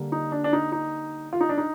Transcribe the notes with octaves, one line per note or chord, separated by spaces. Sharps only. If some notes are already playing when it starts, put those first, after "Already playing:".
Already playing: D3 G3 A#3
D#4
D4
D4
D#4
D#4
F4
D#4
D4
D#4